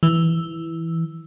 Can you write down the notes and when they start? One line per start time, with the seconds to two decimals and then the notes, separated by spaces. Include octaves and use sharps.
0.03 E3